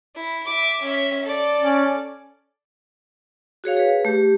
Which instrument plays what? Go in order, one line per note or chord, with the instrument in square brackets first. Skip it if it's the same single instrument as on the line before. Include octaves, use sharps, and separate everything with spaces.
[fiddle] E4
E5 D6
C#4 E5
A4 D5
[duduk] C#4
[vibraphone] F#4 G#4 C#5 F5
G#4 B4
A3 G4